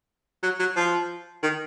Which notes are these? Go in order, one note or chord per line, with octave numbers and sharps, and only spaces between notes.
F#3
F#3
F3
D#3